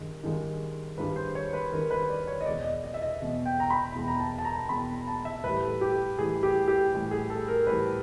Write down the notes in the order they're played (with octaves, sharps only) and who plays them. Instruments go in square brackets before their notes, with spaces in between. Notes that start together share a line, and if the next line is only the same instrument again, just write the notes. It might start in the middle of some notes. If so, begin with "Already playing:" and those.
Already playing: [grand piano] G2 D#3 G#3
G2 D#3 G#3
G2 D#3 G#3 B4
C5
C#5
B4
G2 D#3 G#3 A#4
B4
D5
C#5
D#5
E2 B2 G#3 D5
D#5
D#5
E5
D#5
E2 B2 G#3
G5
A#5
B5
E2 B2 G#3
A#5
A5
A5
A#5
E2 B2 G#3 B5
A5
E5
A2 E3 G3 B4
A4
G4
A2 E3 G3 G#4
G4
G4
A2 E3 G3
G#4
A4
A#4
A2 E3 G3 B4